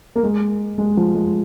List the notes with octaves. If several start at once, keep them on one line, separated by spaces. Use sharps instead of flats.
A#3
G#3
G#3
F3
G#3